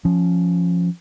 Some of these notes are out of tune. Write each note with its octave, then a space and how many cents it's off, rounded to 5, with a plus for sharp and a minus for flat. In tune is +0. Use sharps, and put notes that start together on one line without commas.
F3 +0 C#4 +0